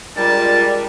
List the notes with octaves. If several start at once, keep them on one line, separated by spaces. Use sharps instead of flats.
G3 G#3 D4 F4 A#4 A5